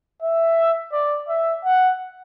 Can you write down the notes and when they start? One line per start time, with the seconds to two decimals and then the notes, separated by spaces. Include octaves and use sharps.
0.22 E5
0.92 D5
1.29 E5
1.64 F#5